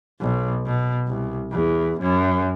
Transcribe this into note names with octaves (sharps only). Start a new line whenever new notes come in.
B1
B2
C2
E2
F#2